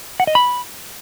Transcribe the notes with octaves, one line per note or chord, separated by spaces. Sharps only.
F#5
D#5
B5